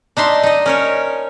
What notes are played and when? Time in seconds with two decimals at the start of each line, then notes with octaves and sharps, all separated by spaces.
0.17 D4 D#4 E5 C6
0.43 D#4 D#5
0.66 C#4 A#4 C#5